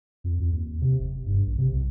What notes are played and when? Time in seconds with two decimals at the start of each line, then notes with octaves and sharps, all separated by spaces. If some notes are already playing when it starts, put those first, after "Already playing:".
0.24 F2
0.40 F2
0.52 D#2
0.81 C3
0.99 F#1
1.26 G2
1.46 A#1
1.58 C3
1.72 C2